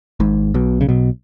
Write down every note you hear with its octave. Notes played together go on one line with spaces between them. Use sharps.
G#1 G#2
B1 B2
C#3
B1 B2